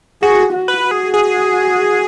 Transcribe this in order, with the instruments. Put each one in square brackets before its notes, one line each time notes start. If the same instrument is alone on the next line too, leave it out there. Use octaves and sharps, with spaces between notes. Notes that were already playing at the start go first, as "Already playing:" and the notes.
[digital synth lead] F#4 [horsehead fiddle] G#4
[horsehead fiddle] F#4
[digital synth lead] B4
[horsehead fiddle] F#4
[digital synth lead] G#4
G#4